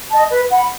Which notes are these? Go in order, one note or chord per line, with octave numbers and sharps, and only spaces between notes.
D#5 A5
B4
F#5 B5